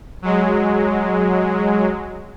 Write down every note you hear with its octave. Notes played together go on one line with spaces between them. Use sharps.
F#3 G#3